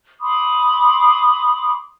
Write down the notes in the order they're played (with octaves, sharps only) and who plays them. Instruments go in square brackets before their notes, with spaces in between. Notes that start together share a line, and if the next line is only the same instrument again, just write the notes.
[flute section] B5 C6 D6 D#6